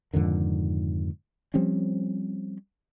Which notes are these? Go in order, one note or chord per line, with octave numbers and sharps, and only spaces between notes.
F2 G#2 D3 D#3
F3 G3 C4 C#4